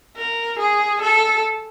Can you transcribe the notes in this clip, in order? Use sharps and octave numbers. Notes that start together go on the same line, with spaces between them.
A#4
G#4
A4